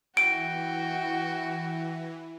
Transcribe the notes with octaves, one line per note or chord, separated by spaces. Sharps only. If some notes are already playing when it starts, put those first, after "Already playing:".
E3 F#4 G5 D7